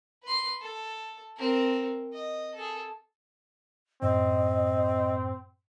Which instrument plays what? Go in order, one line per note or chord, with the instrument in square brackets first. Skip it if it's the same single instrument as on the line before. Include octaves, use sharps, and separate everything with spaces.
[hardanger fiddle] B4 C6
A4
C4 A#4
D#5
G#4 A4
[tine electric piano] F#2 A2 [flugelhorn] C4 [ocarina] D#5